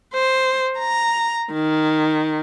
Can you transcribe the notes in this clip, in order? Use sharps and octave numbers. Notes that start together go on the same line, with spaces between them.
C5
A#5
D#3